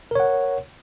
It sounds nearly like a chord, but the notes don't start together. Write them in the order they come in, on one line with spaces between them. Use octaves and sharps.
A#4 C#5 F#5